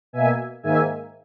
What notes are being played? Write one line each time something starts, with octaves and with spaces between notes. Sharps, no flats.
B2 A#3 E5 G#5
G#2 D#3 A#3 E5 G#5